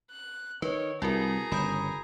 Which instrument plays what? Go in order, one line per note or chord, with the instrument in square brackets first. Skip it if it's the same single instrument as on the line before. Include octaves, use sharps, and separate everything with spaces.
[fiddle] F#6
[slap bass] D#3 [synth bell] B4 [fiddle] C#5
[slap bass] C2 [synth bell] E4 F#4 A#4 [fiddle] G#4 A#5
[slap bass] G1 C#3 [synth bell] B5 D#6 G6